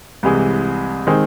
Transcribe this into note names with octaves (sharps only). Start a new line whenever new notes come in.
C2 C3 E3 G#3
D#3 G#3 C4